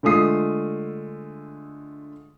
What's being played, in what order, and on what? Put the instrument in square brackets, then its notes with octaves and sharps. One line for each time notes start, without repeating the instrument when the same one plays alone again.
[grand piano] D3 G#3 A3 F4 D#6 C7